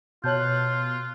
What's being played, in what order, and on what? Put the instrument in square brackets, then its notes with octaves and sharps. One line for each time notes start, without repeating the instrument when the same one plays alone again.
[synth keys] B2 F#6 [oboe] F4 [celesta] C#5 A5 G6